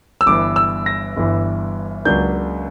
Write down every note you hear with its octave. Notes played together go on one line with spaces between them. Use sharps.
E6
G1 G2 E3 D6
E6
A#6
G1 G2 E3
C#2 C#3 F#3 A#3 D4 G6